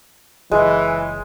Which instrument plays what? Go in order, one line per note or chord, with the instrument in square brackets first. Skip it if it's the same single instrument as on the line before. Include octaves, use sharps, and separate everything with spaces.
[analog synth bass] F#1 [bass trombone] E3 [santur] G#3